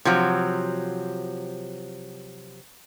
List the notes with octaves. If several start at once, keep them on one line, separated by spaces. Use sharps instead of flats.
C3 F3 F#3